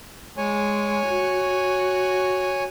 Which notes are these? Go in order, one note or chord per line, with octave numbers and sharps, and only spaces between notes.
G#3 C#5 G#5
F#4